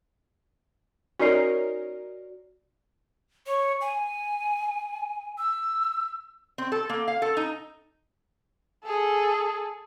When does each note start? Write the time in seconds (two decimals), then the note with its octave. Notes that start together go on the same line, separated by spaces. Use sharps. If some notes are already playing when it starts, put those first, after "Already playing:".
1.19 C#4 D#4 F#4 A#4 D5 C7
3.46 C#5
3.81 G#5
5.38 E6
6.58 C4
6.72 A4
6.89 A#3
7.08 F5
7.22 A4
7.37 D#4
8.84 G#4 A4